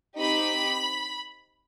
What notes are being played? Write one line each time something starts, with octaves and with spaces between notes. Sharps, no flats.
C4 D#4 G4 B5